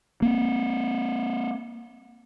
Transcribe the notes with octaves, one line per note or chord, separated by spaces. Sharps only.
A#3 C4